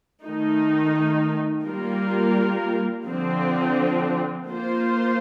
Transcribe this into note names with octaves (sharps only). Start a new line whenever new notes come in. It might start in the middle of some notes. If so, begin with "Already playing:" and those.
D#3 A3 D#4
G3 A#3 F4 A#4
D3 F3 C4
A#3 F4 C5